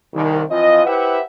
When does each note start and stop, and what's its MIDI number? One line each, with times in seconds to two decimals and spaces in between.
0.14 0.42 36
0.14 0.42 51
0.50 0.84 52
0.50 0.84 53
0.50 0.84 60
0.50 0.84 65
0.50 0.84 75
0.85 1.19 64
0.85 1.19 67
0.85 1.19 71
0.85 1.19 72
0.85 1.19 76
0.85 1.19 78